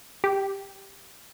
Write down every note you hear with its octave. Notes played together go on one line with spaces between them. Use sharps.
G4